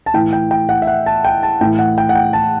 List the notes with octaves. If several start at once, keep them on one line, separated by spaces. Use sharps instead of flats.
A5
A2 E3 G5
G5
G5
F#5
E5
F#5
A5
G5
A5
A2 E3 G5
F#5
G5
F#5
G5
A5